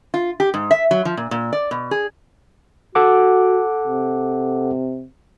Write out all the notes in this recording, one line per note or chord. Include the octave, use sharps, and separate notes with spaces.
F4
G4
G#2
E5
F#3
F3
A#2
A#2
D5
B2
G#4
F#4 A4 F#5 D6
C3